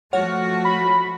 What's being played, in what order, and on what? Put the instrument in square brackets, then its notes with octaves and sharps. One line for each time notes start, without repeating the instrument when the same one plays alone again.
[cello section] F3 A3 F#4 [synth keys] C#5 F#5 F6
[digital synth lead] B5